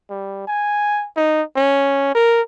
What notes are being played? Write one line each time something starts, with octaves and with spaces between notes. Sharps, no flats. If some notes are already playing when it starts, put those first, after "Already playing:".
G3
G#5
D#4
C#4
A#4